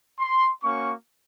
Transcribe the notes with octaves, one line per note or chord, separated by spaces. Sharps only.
C6
A#3 C#4 F#4 C#6